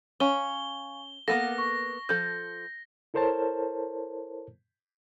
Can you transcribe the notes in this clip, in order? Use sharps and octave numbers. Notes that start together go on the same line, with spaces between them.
C#4 F5 G#5 C#6 G7
A#3 B3 A4 F5 F#5 A#6
C#6
F3 A4 G6
E4 A4 A#4 C5 C#5 A5